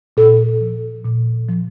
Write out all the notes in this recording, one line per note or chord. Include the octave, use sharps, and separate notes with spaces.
A#2 A4
F3
A#2
F3